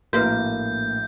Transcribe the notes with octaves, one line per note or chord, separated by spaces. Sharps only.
A#1 A2 A#3 F#4 B4 F5 G6